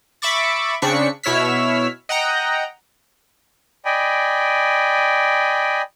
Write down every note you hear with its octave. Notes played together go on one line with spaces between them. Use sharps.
E5 B5 C#6 D6 A6
C#3 C4 D4 C#6 B6 C#7
B2 E4 C#5 E6 F6 B6
D#5 F#5 G5 A#5
D5 D#5 G5 G#5 B5